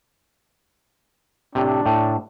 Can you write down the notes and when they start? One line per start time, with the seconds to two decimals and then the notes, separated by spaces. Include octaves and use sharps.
1.55 A2 C3 D4
1.86 A2